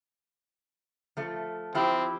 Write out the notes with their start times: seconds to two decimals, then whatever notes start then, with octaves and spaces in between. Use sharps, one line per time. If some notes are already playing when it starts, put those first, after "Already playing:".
1.17 F3 A3
1.75 F3 C4 E4 G4